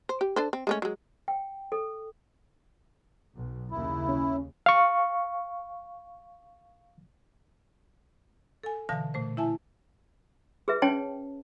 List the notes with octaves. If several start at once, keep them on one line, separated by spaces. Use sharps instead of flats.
C5
G4
D4 A4 C5
C4
G#3 A3 C#4
F#3 G#3
G5
A4
B1
D#2 C#3 E4
C#4
F5 C#6
A4 G#5
B2 D3 E3 F5 A5 A#6
A#2 A3 C5
E4 E5 G#5 A5
G#4 B4 E5
C#4 C#5 G5 A5